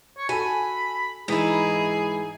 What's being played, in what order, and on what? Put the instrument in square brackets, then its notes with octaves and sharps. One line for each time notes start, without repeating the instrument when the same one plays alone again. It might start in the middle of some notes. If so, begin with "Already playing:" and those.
[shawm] C#5
[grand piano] F#4 A4 [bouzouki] G#5 [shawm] B5
[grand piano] G#2 E3 B6 [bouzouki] D#4 E4 [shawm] G#4